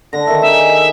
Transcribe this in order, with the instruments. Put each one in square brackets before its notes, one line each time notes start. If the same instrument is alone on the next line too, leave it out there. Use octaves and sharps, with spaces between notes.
[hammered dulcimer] D3 [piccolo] A#6
[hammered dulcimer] D#3 E5
[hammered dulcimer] D#4 G#4 D#5 [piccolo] E5